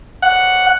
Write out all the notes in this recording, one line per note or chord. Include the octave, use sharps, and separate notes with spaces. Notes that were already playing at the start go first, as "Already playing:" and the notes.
F#5